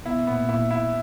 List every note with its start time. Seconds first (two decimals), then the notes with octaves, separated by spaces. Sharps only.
0.05 B2 B3 E4
0.27 A#2 A#3 B3
0.49 A#2 A#3 E4
0.71 E4